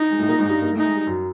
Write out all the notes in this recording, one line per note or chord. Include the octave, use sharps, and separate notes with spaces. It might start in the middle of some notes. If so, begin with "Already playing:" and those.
Already playing: D#4
G#3
A2 A3
A#2 A#3
G#2 G#3
G2 G3
A#3
A3 D#4
G#3
G3
F#2 F#3